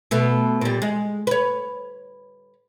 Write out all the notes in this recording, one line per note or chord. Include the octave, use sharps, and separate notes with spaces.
B2 A3 B3
A#2 G3
G#3
B4 C#5